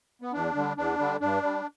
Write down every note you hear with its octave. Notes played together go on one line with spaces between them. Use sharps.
B3
E2 D4
D3 G3
E2 D4
D3 G3
G2 D4
G3